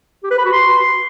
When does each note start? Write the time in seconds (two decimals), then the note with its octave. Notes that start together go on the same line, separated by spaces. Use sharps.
0.24 G4
0.31 B4
0.38 B5
0.46 F#4
0.53 C6